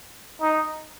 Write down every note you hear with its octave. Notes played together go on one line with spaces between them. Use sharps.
D#4